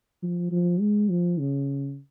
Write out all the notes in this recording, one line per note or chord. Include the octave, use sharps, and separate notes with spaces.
F3
F3
G#3
F3
C#3